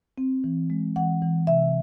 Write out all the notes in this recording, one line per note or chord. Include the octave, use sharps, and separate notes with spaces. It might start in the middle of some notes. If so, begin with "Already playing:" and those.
C4
E3
G#3
E3 F#5
E3
C3 E5